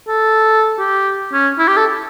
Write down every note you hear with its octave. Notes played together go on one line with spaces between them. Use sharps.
A4
G4
C#4
E4
G4
A4